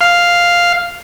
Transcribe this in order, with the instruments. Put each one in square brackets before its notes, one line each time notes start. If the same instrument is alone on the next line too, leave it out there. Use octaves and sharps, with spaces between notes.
[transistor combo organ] F5